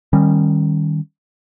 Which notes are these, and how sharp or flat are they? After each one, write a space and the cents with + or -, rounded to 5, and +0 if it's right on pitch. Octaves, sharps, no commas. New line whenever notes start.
D#3 -10 G3 +10 C#4 -25